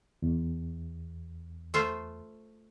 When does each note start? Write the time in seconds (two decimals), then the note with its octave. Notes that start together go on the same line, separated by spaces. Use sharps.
0.22 E2
1.74 A3 F4 C5